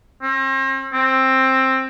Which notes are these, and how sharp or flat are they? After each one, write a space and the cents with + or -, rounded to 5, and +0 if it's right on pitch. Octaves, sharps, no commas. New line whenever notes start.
C4 +40
C4 +10